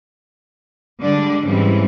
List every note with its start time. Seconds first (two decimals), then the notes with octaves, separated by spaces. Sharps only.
1.01 D3 G3 G#3 D4 D5
1.46 G#2 C#3 E3 G3 C4